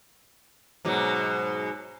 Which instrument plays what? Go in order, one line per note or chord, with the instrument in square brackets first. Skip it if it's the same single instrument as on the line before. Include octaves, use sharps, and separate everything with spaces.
[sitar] G#2 B2 F#3